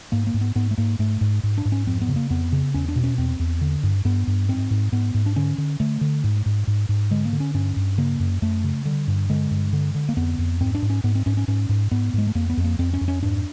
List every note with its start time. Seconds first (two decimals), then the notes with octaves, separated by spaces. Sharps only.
0.12 G#2 A#3
0.27 A#3
0.34 G#2
0.41 B3
0.55 G#2 B3
0.71 A3
0.78 G#2 A#3
0.99 G#2 A3
1.21 G#2
1.43 G#2
1.58 D4
1.65 G#2
1.72 C#4
1.87 F2 C4
2.01 B3
2.09 C#3
2.16 A#3
2.30 F2 B3
2.52 C#3
2.74 E2 C#4
2.89 D4
2.96 B2
3.04 C#4
3.18 E2 C4
3.40 E2
3.61 D3
3.83 G2
4.05 G2 B3
4.27 G2
4.49 G#2 C4
4.71 G#2
4.92 G#2 B3
5.14 G#2
5.26 D4
5.36 D3 C#4
5.58 D3
5.80 D3 A3
6.01 D3
6.24 G#2
6.46 G#2
6.67 G#2
6.89 G#2
7.11 D3 G#3
7.25 A#3
7.33 D3
7.40 C#4
7.54 G2 C#4
7.76 G2
7.98 C#3 A#3
8.20 F#2
8.42 F#2 A3
8.64 C#3
8.85 D3 G3
9.08 G2
9.30 D3 G#3
9.51 G2
9.73 D3
9.95 D3
10.09 A#3
10.17 F2 B3
10.38 F2
10.60 G#2 C4
10.75 D4
10.82 G#2
10.90 C#4
11.04 G#2 B3
11.15 C4
11.26 G#2 C#4
11.37 C#4
11.48 G#2 C#4
11.69 G#2
11.91 G#2 B3
12.13 G#2 G#3
12.27 A3
12.35 F2 A#3
12.50 B3
12.57 F2
12.64 A#3
12.79 F2 C4
12.94 C#4
13.01 F2
13.08 C#4
13.23 G#2 D4